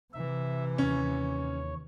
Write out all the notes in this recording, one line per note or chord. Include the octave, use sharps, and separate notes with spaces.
C3 E3 E5
D#2 C#4 C#5